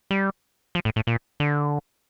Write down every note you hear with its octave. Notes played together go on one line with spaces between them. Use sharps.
G3
F3
A2
A2
A#2
D3